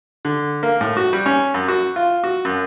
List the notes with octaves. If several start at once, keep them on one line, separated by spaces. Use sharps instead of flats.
D3
A#3
A2
F#4
G3
C#4
F#2
F#4
F4
F#4
F#2